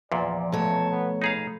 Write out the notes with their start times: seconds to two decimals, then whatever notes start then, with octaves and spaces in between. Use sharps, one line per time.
0.12 E2 A#2 F3 D5
0.52 B2 A3 C#5 A5 A#5 D7
0.92 B3
1.22 D#4 G#4 F5 A#5 B5 C7